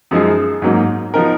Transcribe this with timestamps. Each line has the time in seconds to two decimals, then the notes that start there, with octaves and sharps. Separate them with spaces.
0.11 F#2 F3 G#3 D#4 G#4
0.62 G#2 F#3 A#3 D#4
1.14 F3 B3 D#4 A#4